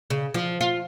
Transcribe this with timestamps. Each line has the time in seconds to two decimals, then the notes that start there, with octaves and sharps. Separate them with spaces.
0.10 C#3
0.34 F3
0.61 F4